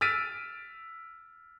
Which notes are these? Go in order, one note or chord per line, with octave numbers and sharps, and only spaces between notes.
E6 F6 A6 B6 D7 D#7